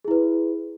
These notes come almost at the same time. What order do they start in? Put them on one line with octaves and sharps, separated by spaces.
G#4 E4 B4